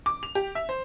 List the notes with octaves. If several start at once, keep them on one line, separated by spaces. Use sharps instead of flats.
D6
F7
G4
E5
C5